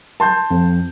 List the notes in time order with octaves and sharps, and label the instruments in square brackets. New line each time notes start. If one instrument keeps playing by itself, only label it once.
[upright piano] A5 C6 G6
[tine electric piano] F2